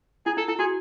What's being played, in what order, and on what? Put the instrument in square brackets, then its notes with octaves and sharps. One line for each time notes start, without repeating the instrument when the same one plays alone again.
[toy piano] E4 [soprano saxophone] G#4
[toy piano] E4 [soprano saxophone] A4
[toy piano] E4 [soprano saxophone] A4
[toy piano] F#4 [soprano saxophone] G#4